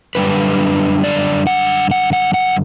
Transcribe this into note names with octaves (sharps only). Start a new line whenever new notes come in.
F#2 D3 G3 D4 B4
D5
F#5
F#5
F#5
F#5